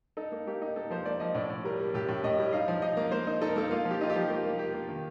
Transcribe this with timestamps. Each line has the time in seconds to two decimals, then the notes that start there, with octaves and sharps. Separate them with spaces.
0.17 D#4 A4
0.32 A#3
0.47 A#3 G4
0.62 D#4
0.76 A#3 A4
0.91 F3 C5
1.06 A#3 D5
1.20 F3 D#5
1.35 A2 D5
1.50 A2
1.64 G3 A#4
1.79 G3
1.94 A2 G4
2.09 A2
2.24 A2 D#5
2.39 G3
2.53 D#4 F5
2.68 F3
2.82 D#4 D#5
2.97 A#3
3.11 A#3 C5
3.27 D#4
3.41 D#4 A4
3.49 A#4
3.56 A#3 A4
3.71 A#3 F4
3.85 F3
3.91 G4
4.01 D#4 F4
4.10 G4
4.16 F3
4.30 A#3 G4
4.44 A#3
4.59 A#3 G4
4.74 A#3
4.89 D#3